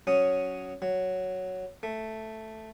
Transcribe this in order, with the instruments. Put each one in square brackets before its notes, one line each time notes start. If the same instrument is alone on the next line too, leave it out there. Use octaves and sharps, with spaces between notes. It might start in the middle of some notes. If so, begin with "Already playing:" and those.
[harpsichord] F#3 C#4 D#6
F#3
A3